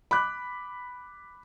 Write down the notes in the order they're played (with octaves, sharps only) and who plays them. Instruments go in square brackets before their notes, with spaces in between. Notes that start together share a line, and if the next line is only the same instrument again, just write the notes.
[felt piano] B5 D6 F#6